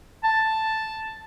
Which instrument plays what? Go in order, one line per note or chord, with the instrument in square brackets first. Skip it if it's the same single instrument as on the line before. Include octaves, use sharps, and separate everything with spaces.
[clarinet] A5